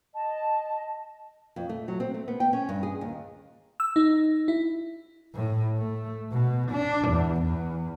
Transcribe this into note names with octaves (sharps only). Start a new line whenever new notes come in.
D#5 A5
F2
A3
F#3
C4
A3
B3
G5
C#4
G2
G#4
D#2
E6
D#4
E4
A2
A3
B2
D4
E2
E2